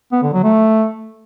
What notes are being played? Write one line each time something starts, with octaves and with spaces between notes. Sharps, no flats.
B3
D3
F#3
A3